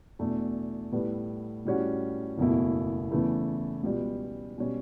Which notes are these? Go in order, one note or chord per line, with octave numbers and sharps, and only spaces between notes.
E2 B2 A3 D4
A2 G3 B3
A2 G3 C#4 F#4
F#1 E2 B2 A3 E4
E2 C#3 E3 A3 E4
C#2 B2 G3
B2 G3 C#4